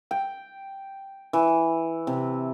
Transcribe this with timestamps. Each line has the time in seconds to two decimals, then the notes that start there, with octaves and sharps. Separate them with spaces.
0.11 G5
1.33 E3
2.07 C3